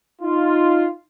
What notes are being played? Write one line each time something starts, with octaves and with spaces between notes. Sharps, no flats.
D#4 F4